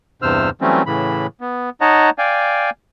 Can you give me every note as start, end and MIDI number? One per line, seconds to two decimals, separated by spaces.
0.22 0.50 40
0.22 0.50 43
0.22 0.50 48
0.22 0.50 72
0.22 0.50 88
0.22 0.50 89
0.61 0.83 52
0.61 0.83 54
0.61 0.83 55
0.61 0.83 57
0.61 0.83 60
0.61 0.83 61
0.86 1.26 45
0.86 1.26 49
0.86 1.26 52
0.86 1.26 83
1.41 1.70 59
1.81 2.10 63
1.81 2.10 73
1.81 2.10 75
1.81 2.10 78
1.81 2.10 81
1.81 2.10 82
2.18 2.70 74
2.18 2.70 77
2.18 2.70 79
2.18 2.70 80